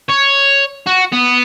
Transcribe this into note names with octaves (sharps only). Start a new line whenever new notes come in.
C#5
F#4
B3